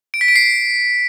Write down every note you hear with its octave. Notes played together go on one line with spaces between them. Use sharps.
D7
B6
D7
C7